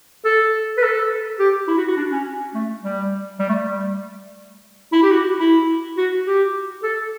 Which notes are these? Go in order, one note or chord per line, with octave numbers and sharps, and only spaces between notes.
A4
B4
A4
G4
E4
F#4
F#4
D4
C#4
A3
G3
G3
A3
G3
E4
G4
F#4
E4
F#4
G4
A4